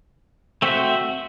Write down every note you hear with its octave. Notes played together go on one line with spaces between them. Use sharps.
A3 C4 F#4 C5 E5